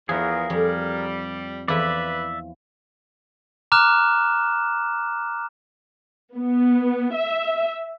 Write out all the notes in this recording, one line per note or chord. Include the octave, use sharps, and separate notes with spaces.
E2 F3 G#4 A#4
F2 G3
E2 F3 E4 B4 D5 E5
A#5 D6 F6 F#6 E7
B3
E5